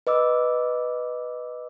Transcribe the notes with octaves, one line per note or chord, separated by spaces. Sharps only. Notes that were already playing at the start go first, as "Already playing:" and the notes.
B4 D#5 D6 E6